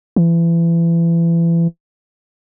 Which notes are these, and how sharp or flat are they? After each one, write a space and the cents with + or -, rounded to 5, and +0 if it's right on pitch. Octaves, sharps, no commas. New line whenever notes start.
E3 +30